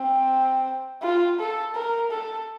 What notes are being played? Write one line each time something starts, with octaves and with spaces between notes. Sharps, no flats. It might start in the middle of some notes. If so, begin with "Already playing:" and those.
Already playing: C4
F4
A4
A#4
A4